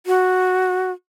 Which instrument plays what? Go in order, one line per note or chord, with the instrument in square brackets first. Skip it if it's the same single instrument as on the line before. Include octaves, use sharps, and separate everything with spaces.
[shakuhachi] F#4